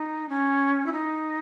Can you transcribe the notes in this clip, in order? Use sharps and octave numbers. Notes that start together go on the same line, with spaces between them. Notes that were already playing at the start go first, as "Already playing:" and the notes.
Already playing: D#4
C#4
E4
D#4